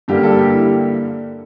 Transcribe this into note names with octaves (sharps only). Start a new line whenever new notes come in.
G2 D3 G3 A#3 G4
A4
G4
E4